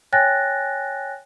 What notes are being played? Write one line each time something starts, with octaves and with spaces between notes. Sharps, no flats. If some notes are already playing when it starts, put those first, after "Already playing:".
C#5 G5 G#5 F#6 A6 A#6